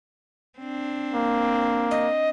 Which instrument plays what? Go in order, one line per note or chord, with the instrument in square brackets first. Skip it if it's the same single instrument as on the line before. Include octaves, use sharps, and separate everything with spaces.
[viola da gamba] C4 D4
[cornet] A#3
[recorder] D#5